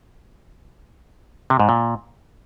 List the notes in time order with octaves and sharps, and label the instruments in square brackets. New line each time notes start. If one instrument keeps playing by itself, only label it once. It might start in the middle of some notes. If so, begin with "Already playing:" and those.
[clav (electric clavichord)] C3
G#2
A#2